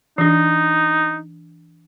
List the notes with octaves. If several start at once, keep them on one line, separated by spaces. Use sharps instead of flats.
E3 D4 D#4